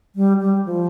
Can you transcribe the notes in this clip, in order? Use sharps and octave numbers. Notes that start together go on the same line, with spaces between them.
G3
G3
F3